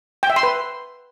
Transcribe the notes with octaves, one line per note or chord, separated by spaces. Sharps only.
G5
E5
C6
B4